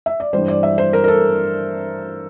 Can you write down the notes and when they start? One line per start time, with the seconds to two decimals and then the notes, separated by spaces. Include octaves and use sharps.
0.06 E5
0.20 D5
0.33 G2 E3 G3 C5
0.48 D5
0.63 E5
0.78 C5
0.93 A#4
1.04 A#4
1.08 A4